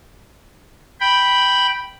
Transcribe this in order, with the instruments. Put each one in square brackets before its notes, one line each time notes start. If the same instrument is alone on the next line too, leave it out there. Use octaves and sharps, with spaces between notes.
[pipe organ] G5 B5